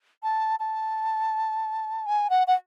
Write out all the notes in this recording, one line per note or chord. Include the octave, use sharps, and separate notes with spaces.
A5
A5
G#5
F#5
F#5